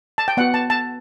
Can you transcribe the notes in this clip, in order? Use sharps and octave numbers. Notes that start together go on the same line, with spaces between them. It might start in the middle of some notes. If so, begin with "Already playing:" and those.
A5
G5
B3 F#4 F#5
A5
A5